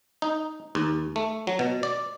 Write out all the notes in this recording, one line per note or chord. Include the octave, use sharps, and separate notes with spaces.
D#4
D#2
A3
F#3
B2
D5